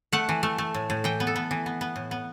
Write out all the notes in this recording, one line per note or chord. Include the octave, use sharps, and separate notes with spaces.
A3 F#5
E3
A3
A3
A2
A2
E3 G5
B3
A4
B3
E3
B3
B3
A2
B3